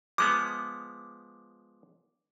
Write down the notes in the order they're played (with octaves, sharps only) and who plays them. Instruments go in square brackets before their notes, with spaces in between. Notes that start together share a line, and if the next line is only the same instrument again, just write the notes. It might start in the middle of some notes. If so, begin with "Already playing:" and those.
[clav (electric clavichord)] F3 G#3 B3 [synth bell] D6